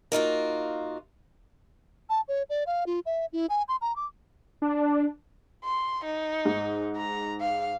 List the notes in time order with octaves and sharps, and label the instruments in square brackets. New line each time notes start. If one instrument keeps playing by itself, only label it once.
[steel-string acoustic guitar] A#3 D#4 F4 F#4
[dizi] A5
C#5
D5
F5
F4
E5
E4
G#5
C6
A#5
D6
[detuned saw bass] D4
[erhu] C6
D#4
[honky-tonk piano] G#2
[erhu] A#5
F5